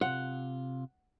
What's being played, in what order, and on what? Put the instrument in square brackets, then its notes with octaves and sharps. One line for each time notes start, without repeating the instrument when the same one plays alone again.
[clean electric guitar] C3 F4 [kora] F#5